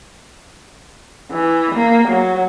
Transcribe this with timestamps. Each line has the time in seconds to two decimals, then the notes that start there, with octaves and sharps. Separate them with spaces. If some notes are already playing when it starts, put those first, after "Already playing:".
1.32 E3
1.75 A#3
2.08 F#3